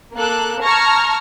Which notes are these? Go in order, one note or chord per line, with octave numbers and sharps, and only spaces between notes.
A#3 A4 F#6
A5 A#5 C#6 F6 G#6 A#6